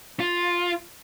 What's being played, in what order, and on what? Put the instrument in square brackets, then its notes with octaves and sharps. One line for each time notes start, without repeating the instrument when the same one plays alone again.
[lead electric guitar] F4